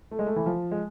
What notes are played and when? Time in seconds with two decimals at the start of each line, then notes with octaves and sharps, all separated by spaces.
0.11 A3
0.19 G#3
0.26 A3
0.36 E3
0.46 F3
0.71 G#3